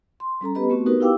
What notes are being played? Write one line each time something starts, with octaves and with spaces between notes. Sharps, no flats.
C6
G3 C#4 A4 A#5
B3 G4 B4 D#5 B5
A3 B3 C4 F#4 C#6
B3 D#4 F#4 G4 A#4 B4
E4 G4 F5 G5 D6 E6